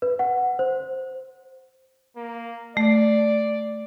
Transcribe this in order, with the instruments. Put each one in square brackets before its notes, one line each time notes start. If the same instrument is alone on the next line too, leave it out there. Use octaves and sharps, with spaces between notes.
[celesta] B4
F#5
C5
[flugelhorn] A#3
[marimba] A3 [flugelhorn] D5